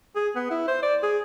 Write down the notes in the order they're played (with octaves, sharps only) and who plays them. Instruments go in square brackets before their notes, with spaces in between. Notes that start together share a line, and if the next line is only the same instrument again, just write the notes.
[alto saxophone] G#4
B3
E4
C5
D5
G#4